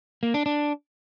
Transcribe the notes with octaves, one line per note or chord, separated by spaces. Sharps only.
A#3
D4
D4